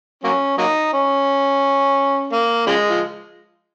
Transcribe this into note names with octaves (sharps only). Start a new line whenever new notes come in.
F#3 A#3 C#4
F#3 A#3 D#4
C#4
A#3
C#3 F3 G#3
F3